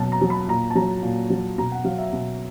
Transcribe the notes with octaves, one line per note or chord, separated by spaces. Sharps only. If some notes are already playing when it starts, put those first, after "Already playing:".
Already playing: B2 F#3 A5
A#5
F#3
B5
A#2 A#5
A5
F#3 A#5
A#2
F#3
B2 A#5
F#5
F#3 F5
E5
B2